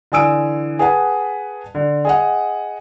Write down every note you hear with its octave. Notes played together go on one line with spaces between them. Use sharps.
D3 E3 G#5 D#6 E6 D7
G#4 B4 F#5 A5
D3
G#4 D#5 F#5